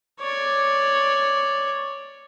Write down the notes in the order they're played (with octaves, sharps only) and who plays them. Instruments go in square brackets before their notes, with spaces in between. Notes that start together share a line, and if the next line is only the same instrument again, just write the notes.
[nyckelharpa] C#5 D5